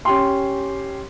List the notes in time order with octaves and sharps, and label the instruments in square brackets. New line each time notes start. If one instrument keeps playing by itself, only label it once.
[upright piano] C#4 G4 C6